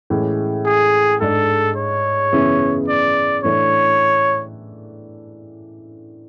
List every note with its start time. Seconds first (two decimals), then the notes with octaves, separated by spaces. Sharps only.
0.10 A2 E3 G#3 C#4
0.66 G#4
1.21 G#2 G#3 D4 A4
1.76 C#5
2.32 F#2 C#3 E3 B3 E4
2.88 D5
3.43 A2 E3 A3 D4 C#5